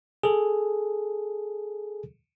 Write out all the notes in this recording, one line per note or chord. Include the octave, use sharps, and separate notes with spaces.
G#4 A4